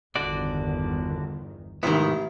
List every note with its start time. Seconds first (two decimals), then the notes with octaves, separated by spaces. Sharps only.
0.16 G1 E2 D3 D#3 F#4 D5
1.83 A1 F2 G#2 C3 D#3 B3 E4